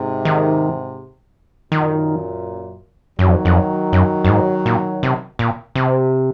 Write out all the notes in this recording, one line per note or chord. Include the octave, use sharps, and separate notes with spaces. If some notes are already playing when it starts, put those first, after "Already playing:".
Already playing: G#2 C3
D#3
F#2 A#2 D#3
F#2 D#3 F#3
F2
F2
F#2
F#2
G#2
A#2
C3
A#2
C3